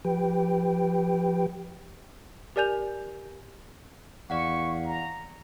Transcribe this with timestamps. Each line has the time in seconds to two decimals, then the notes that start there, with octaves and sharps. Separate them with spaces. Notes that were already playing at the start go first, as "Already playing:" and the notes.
0.05 F3 G4 B4 G5
2.56 G4 A#4 D5 G#5 G6 F7
4.30 E2 D5 F5 F#5 C#6
4.85 A#5